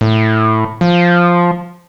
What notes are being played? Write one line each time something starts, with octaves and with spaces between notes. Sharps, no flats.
A2
F3